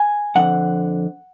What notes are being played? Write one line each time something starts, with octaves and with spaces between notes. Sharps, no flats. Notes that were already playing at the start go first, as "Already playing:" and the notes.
Already playing: G#5
F2 D3 F3 F#5